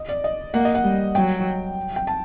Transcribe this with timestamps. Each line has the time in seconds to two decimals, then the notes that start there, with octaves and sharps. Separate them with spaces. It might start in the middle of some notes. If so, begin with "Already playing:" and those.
Already playing: D#5
0.09 D5
0.24 D#5
0.54 A#3 F#5
0.65 D#5
0.75 F#5
0.84 G3
1.15 F#3 G5
1.96 G5
2.07 A5